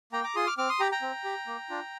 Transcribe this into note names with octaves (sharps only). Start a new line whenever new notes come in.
A#3 G5 A#5
A#5 D6
F4 G#4 C6 D#6
D6 F6
C4 D6 F6
C6 D#6
G4 G5 A#5
G5 A#5
C4
G4
A#3
D4 F4